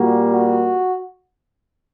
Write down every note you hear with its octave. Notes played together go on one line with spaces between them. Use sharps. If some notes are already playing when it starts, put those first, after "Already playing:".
Already playing: A#2 G3 A#3 F#4
F#4